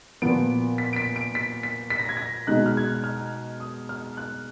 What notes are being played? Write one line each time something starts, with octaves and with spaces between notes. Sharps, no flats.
A#2 F3 B3 D7
B6
D7
B6
D7
B6
B6
B6
A#6
G#6
A#6
B2 G#3 D#4 F#6
F6
G#6
F#6
F6
D#6
F6
F#6